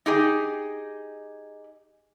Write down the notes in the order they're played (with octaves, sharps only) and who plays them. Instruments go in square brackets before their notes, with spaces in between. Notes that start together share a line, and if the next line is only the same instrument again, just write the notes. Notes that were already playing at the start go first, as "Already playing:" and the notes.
[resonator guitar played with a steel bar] D#4 G4 G#4